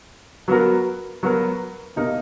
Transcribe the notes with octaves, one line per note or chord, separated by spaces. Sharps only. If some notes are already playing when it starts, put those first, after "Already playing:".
F#3 B3 F#4 A#4
F#3 B3 F#4 A#4
B2 A#3 D#4 A#4